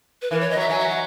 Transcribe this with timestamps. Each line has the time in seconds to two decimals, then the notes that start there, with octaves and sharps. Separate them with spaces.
0.22 B4
0.31 E3 A#4
0.40 C#5
0.50 D#5
0.57 F#3 E5
0.69 F#3 G#5
0.79 E5
0.89 F#5